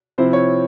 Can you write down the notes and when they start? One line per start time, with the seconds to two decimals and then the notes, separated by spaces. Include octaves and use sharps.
0.18 C3 F3 C4 E4 C5
0.33 C#5